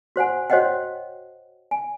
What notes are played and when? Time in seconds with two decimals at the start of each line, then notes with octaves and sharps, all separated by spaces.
0.16 F#4 C5 F#5 G#5
0.50 F#4 C5 C#5 D#5 F#5 G5
1.71 G#5